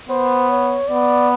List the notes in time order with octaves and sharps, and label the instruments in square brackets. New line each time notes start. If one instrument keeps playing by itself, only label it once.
[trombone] B3 [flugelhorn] C5
[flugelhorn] C#5
[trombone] B3 [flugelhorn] D5